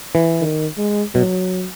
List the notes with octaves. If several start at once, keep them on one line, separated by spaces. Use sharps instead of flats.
E3
D#3
G#3
B2 F#3